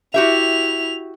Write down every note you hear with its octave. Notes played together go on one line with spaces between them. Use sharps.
E4 F#4 G4 E5 F7